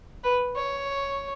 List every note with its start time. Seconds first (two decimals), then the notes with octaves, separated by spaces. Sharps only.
0.24 B4
0.56 C#5